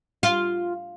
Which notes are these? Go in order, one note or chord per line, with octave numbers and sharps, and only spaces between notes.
F4